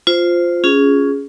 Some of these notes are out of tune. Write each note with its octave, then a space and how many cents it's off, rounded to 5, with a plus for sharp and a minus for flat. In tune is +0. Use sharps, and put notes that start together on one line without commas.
F4 +0 C5 -10
C#4 +15 F4 +10 G#4 +0